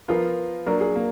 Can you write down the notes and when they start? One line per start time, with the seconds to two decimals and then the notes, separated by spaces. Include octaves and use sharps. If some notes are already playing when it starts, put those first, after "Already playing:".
0.08 F3 B3 F4 A#4
0.66 F#3 A#3 D4 A#4
0.81 G#4
0.95 A#3